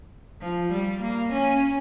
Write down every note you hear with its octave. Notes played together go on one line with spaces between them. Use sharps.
F3
G3
A#3
C#4